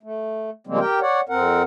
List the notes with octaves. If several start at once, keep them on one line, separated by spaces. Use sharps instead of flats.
A3
C#3 F3 G3 G#3 A#3 C4
G4 A#4 G5
C#5 D5 F#5
F2 C4 A#4 F#5